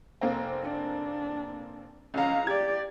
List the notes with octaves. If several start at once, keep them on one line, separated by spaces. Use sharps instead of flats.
F1 A#3 C4
D4
C#2 C#4 F5 A#5
G4 D5 G#6